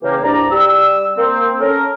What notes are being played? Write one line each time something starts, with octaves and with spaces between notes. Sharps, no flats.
C#3 E3 A#3 G4
C2 G2 D5 A#5
G3 E6
A#3 C4
C#4 A4 A#4